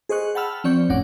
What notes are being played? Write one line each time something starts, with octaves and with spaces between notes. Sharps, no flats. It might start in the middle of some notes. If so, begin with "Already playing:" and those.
G#4 C5 D#5 C#6 F#6
F#5 G5 A5 B5 E6 F6
F3 C4 D5 C#6 G6
G1 F2 A2 C#4 F#5 D6